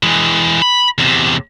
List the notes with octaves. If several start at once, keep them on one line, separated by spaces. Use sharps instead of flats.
E3 G#3
B5
E2 C3